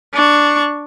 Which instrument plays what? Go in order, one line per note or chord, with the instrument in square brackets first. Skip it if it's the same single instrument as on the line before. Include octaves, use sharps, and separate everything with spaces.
[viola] D4 C#6